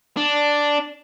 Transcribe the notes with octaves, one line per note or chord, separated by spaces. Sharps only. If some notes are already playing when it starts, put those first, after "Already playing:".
D4